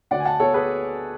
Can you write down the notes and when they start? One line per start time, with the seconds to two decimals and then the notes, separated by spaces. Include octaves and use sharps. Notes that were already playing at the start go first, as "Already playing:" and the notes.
0.11 D2 D5 F#5
0.20 G#5
0.25 F#5 A5
0.40 B3 A4 C#5
0.54 G#4 B4